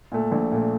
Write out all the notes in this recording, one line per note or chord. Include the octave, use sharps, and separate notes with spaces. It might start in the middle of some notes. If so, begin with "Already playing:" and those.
A#2 A3
A#1
A#2 A3